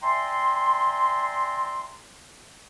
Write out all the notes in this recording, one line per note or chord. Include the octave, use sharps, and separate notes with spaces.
D5 E5 G5 G#5 A#5 C6